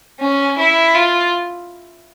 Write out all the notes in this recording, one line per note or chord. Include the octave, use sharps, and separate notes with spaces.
C#4
E4
F4